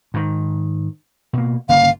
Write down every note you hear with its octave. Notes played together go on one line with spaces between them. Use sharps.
G#2 D#3
B2 A#3
G1 C#3 A#3 F5